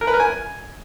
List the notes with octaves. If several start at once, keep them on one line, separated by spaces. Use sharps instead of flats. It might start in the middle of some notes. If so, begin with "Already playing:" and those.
A#4
B4
A#4
G#5